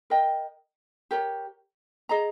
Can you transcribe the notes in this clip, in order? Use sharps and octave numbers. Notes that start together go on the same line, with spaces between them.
A#4 D#5 G5
G4 A#4 C#5
G#4 D#5 A#5